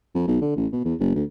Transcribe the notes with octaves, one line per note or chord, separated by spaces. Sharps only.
F2
B1
D3
A1
B2
E2
F#1
D2